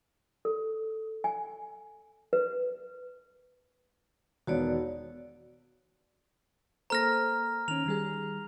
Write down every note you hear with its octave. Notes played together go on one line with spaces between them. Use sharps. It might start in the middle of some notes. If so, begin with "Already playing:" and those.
A4
G#5
B4
E1 D#3 B3 F#4 C#5 D5
A#3 A4 C5 A#5 F6 A#6
D#3 C#4 F7
D#3 G3 G#4